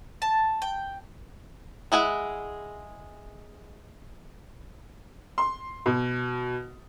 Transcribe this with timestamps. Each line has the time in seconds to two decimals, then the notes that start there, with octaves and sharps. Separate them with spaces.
0.22 A5
0.62 G5
1.92 G#3 E4 G#4 F#5
5.38 C6
5.86 B2